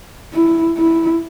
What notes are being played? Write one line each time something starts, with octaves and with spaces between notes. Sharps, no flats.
E4
E4